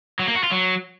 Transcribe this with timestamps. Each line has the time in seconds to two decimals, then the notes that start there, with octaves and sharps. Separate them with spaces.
0.19 F#3
0.27 A#3
0.36 F#4
0.44 F4
0.52 F#3